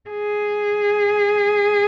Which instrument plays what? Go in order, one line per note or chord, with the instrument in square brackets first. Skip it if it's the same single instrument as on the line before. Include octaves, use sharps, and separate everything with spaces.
[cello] G#4